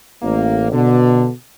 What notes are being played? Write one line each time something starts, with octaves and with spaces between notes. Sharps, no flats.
A1 A#3
B2 D3